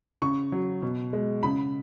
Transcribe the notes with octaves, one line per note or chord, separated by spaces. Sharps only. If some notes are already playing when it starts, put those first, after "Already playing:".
C#3 C#6
F#3
B2
G#3
C#3 B5